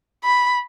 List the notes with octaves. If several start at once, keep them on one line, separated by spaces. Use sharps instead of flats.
B5